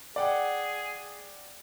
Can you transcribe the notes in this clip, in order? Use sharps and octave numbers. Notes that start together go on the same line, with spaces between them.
G#4 D5 F#5 G5